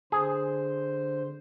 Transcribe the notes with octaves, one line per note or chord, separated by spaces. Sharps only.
D3 G#4 C5